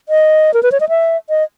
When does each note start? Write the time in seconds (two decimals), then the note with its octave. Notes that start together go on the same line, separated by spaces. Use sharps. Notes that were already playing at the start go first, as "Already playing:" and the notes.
0.09 D#5
0.54 A#4
0.63 B4
0.72 C#5
0.80 D#5
0.89 E5
1.29 D#5